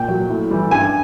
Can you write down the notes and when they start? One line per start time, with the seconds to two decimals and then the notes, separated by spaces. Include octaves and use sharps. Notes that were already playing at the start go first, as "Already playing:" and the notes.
Already playing: A#2 G5
0.08 F#3
0.30 A2
0.51 E3 G3
0.71 G2 G#5